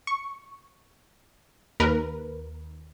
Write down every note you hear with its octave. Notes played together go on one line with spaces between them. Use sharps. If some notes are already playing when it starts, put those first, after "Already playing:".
C#6
D#2 A#4 B4